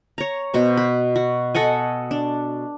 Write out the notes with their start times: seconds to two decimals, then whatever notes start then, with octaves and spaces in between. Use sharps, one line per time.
0.18 C#5 A#5
0.54 B2 F#4 C5
0.77 B4
1.16 F#4
1.54 A4 D#5 F#5 G#5
2.11 D4